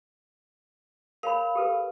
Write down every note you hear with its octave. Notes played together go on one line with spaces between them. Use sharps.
A#4 C#5 F5 B5
G4 A4 B4